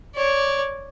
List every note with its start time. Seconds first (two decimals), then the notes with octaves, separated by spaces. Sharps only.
0.15 C#5 D5